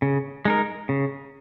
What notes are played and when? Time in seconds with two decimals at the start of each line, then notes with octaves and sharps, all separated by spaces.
0.02 C#3
0.45 G#3 D#4 A#4
0.89 C#3